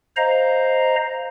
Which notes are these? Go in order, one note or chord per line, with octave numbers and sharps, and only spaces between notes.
C5 D#5 F5 A#5